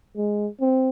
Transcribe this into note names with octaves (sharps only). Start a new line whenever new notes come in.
G#3
C4